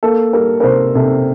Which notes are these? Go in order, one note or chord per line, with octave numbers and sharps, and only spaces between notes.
A#3 A4
G3 A#4
A#4
C3 C5
C3 A4